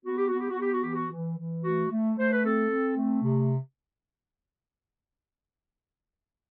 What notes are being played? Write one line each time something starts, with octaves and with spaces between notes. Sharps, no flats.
B3 F#4
G4
F#4
B3
G4
F#4
B3 G4
F#4
E3 G4
F#4
E3
E3
A3 F#4
A3
A3 C5
B4
C4 A4
C4
A3
C3